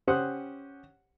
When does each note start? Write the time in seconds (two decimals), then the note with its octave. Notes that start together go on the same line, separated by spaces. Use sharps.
0.07 C#4 G4 C5 F#5 D#6 F#6